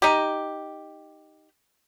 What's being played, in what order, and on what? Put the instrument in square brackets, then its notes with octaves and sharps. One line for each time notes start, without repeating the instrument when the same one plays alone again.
[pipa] D#4 G4